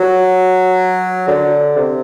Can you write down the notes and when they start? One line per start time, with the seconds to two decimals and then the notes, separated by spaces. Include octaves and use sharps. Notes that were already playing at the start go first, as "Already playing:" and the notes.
Already playing: F#3
1.28 D3
1.76 C3